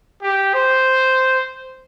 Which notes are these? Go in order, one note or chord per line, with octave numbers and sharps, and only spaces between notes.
G4
C5